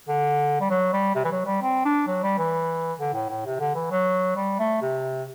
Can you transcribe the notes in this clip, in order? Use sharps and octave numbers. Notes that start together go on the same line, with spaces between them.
D3
G3
F#3
G3
C3
E3
F#3
G3
C4
D4
F#3
G3
E3
D3
A2
A2
C3
D3
E3
F#3
G3
A3
C3